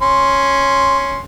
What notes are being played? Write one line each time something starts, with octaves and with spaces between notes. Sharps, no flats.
C#4 C6